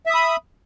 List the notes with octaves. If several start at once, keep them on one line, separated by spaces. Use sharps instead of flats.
E5 B5 D#6